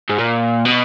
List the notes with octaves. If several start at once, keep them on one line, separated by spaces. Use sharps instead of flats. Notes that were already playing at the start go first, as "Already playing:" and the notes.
G#2
A#2
B2